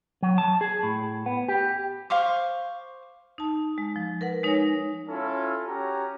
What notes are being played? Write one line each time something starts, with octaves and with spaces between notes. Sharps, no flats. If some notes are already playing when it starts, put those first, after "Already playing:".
F#3
A5
G#4
A2
B3
G4
C5 F5 C#6 D6
D#4 A5
G#3
F3
A#4 B4 F#5
G#3 D#4 C#5 G#5 A#6
C#4 E4 F4 A4
C#4 F#4 G4 A#5